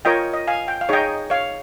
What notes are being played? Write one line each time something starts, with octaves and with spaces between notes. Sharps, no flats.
F4 A#4 C#5 D#5 G5
D#5
F5 G#5
G5
F5
D#4 G#4 C#5 D#5 G5
C#5 F5